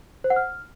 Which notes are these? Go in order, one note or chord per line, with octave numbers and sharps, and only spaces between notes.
C5
F#5
F6